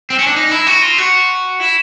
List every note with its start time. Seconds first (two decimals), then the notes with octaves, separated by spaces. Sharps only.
0.10 C4
0.19 C#4
0.27 D4
0.36 D#4
0.51 E4
0.67 F#4
0.82 F4
0.98 F#4
1.60 E4